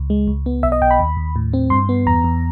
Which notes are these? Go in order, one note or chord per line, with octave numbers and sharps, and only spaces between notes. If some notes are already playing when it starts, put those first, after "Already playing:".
Already playing: C#2
G#3
C#2
B3
B1 E5
D#5
B1 G5
B5
D#2
D#2
A2
C4
G2 C6
B3
E2 A#5
E2